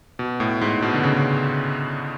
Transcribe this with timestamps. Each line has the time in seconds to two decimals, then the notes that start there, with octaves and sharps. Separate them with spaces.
0.19 B2
0.40 A2
0.61 G#2
0.82 B2
0.94 D3
1.03 C#3